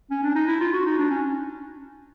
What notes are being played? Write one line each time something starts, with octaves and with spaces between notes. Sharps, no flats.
C#4
D4
D#4
E4
F4
F#4
D#4
D4
C#4